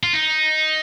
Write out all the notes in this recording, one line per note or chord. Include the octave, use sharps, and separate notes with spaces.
F4
D#4